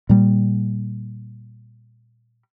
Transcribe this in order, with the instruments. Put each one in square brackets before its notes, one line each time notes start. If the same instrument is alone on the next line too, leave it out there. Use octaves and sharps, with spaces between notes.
[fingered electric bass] A#2 G3